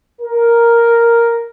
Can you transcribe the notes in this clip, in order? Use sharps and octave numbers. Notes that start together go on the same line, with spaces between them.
A#4